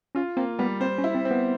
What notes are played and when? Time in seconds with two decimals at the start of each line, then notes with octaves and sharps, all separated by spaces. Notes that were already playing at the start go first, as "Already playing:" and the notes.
0.15 C#4 F4
0.37 A#3 C4
0.59 G3 B3
0.81 C4 C5
0.98 C#4
1.04 E4
1.15 C4
1.25 C4
1.31 B3